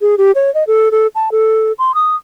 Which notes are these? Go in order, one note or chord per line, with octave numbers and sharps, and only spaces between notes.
G#4
G4
C#5
D#5
A4
A4
A5
A4
C6
D#6